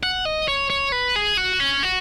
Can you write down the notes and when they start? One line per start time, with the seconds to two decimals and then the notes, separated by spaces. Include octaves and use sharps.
0.03 F#5
0.25 D#5
0.48 C#5
0.70 C#5
0.92 B4
1.16 G#4
1.37 F#4
1.60 C#4
1.83 F#4